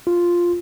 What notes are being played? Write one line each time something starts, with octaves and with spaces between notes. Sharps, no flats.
F4